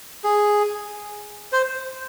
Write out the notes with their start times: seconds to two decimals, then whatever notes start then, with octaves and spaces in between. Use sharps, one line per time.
0.24 G#4
1.53 C5